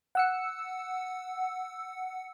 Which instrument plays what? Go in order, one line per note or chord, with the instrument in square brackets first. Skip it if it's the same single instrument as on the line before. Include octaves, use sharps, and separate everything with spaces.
[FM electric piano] F#5 E6 C#7